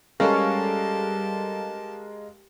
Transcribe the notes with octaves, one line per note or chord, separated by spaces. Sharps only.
G3 G#3 C#4 G4 A4 A#4 F5 A5